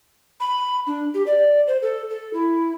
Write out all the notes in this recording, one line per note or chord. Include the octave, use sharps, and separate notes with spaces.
B5
D4
G4
D5
C5
A4
A4
E4